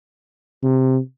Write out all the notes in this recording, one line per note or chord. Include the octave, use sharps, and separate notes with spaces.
C3